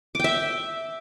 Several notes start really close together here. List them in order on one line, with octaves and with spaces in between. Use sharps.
D6 G5 E5